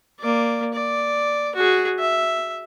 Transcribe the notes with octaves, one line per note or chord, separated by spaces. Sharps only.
A#3 D5
D5
F#4 G#4
E5